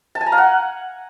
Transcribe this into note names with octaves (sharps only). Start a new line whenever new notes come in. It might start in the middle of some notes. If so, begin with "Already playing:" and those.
A5
G#5
A#5
F5
F#5